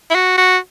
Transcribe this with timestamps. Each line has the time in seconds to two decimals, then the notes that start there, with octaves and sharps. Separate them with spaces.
0.10 E4
0.15 F#4
0.38 F#4